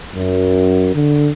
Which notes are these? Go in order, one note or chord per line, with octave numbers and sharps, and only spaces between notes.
F#2
D3